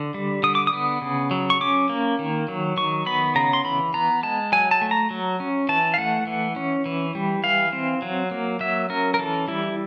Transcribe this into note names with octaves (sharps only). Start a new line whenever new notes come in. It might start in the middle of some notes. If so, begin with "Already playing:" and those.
Already playing: D3
G3
D3 D#6
D6
D#6
B3
C#3
F#3
C#6
C#4 D6
A#3
D#3
F#3
D#3 C#6
B3 B5
C#3 A#5
C6
E3 B5
B3 A#5
G#3 A5
F#3 G#5
A5
A3
A#5
F#3
C#4
E3 A5
F5
A3 F#5
E3
C#4
E3
G3
E3 F5
C4
F#3
A#3
F#3 E5
C#4 A#4
A#4
E3 A4
G3 E4